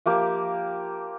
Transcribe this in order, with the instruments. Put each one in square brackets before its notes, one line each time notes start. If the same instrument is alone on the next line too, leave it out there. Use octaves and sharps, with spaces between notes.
[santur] F3 A#3 G4